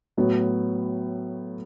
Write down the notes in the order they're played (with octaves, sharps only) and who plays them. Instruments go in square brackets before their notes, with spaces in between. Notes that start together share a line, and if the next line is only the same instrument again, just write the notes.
[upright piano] A2 F#3 B3 F#4